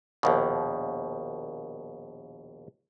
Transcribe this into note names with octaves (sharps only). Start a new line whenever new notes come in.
A#1 D#2 B2